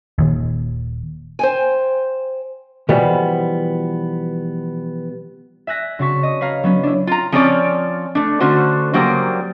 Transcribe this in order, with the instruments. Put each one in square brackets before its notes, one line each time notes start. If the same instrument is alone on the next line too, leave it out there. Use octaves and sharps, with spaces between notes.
[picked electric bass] D#1 D#2
[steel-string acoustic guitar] C5 G5 G#5
[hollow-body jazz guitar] B2 E3 F3 G3 B3
[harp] E5 G#5 F#6 A#6 B6
C#3 C4 F#4 A5 C#6 B6
D#5
B4 C#5 F5 A#5
F#3 B3 C#4
D4 E4
[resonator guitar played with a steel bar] F4 A#5
F3 C4 C#4 F4 C#5 D5
A3 D4
D3 A3 C#4 F#4 C5
C#3 F#3 G3 A#3 C5